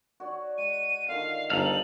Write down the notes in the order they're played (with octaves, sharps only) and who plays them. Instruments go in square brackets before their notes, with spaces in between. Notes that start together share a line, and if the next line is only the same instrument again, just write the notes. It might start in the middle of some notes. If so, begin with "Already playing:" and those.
[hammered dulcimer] F#4 C#5 D5
[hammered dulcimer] G#3 [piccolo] D#7
[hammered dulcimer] D3 D#3 F4 [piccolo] F5
[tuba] G1 [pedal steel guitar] D#4 A4 F5 [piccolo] F#7